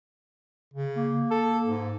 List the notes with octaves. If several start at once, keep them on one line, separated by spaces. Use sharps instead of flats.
C#3
A#3
A4
G#2